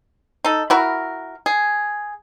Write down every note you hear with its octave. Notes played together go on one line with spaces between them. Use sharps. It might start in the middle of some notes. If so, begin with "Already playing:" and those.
D#4 A4
E4 F#4 A#4
G#4